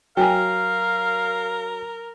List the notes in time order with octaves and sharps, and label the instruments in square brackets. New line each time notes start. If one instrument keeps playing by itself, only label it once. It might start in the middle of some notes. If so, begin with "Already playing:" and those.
[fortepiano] F#3 [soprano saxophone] A#4 [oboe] F5 [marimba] G5 G#5